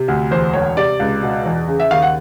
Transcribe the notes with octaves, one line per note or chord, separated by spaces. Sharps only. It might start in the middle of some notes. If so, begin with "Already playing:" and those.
Already playing: C3
D2
E2 C5
E1 C#5
C3 D5
C#2
B2
E2
C#3
E5
D#2 F5
F#5